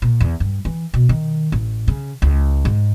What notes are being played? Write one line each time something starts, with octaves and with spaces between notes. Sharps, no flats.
A#2
E2
G2
E3
B2
D#3
A1
C#3
C#2
G#2